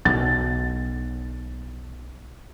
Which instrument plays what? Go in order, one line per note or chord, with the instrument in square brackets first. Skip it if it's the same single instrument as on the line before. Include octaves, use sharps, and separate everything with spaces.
[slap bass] B1 [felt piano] A6